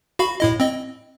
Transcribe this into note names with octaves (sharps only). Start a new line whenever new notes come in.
F#4 F5 B5
A2 E4 D#5
C4 D#5